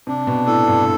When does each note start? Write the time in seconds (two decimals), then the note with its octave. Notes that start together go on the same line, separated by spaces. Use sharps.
0.07 C3 D4
0.27 B2
0.47 A2 A4
0.67 G2